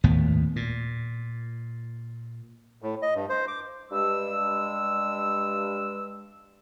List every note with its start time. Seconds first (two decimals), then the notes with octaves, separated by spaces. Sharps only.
0.04 G#1 D#2 A2 B3
0.56 A#2
2.82 A2
3.02 D#5
3.16 G2
3.29 C5
3.48 D6
3.91 G2 G#3 E6